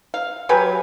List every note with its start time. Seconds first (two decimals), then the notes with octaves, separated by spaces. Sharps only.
0.14 F5
0.49 F#3 G4 B4 G#5